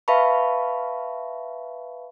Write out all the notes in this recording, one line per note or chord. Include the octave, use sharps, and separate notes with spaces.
B4 E5 F5 A5 B5 C#6